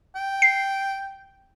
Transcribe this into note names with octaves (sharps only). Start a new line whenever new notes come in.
G5
C7